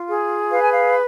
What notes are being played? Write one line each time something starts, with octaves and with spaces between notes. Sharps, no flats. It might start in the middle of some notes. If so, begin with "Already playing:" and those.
Already playing: F4
G#4
B4 F5
G#5
F5